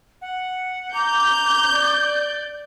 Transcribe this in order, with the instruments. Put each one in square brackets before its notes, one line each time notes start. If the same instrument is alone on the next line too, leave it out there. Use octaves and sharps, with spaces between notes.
[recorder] F#5
[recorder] A#5 [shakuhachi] D6 [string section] G6
[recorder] D5